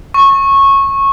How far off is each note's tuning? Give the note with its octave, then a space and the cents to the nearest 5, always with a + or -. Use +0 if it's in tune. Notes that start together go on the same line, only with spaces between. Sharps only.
C#6 -15